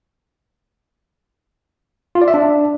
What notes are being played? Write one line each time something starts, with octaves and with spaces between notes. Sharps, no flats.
F4
D5
E5
D4